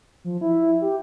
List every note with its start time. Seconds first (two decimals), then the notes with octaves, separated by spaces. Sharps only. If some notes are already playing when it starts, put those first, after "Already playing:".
0.24 F3
0.41 E4
0.81 G4